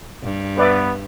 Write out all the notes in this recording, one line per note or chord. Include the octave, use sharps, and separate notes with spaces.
G2
B3 B4 D5 E5